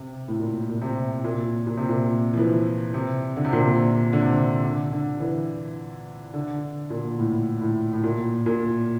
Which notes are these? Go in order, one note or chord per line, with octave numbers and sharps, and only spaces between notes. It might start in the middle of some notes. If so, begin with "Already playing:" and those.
Already playing: C3
A2
A#2
A#2
C3
A#2
A#2
C3
A#2
F3
E3
C3
D3
C3
A#2
C3
D3
C3
D3
D3
E3
D3
A#2
A2
A2
A2
A#2
A#2